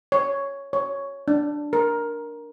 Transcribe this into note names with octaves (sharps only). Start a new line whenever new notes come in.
C#5
C#5
D4
A#4